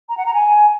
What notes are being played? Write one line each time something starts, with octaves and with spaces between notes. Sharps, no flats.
A#5
F#5
A#5
G#5